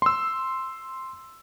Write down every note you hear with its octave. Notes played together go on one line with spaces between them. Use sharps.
C6 E6